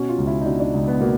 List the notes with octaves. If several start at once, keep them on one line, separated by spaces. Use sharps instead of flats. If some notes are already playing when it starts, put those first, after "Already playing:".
Already playing: B2 C#4
F4
C#2
E4
D#4
B2 D4
D4
C#2
B3
B2 A#3